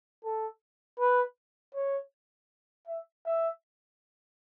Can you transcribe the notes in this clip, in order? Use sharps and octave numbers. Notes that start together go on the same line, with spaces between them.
A4
B4
C#5
E5
E5